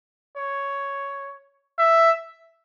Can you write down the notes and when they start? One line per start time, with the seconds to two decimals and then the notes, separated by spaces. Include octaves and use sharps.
0.37 C#5
1.78 E5